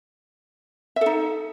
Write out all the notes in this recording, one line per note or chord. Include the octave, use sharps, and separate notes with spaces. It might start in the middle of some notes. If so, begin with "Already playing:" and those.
D#4 A4 E5